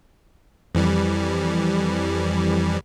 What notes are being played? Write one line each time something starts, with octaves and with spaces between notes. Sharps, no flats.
F2 E3 G3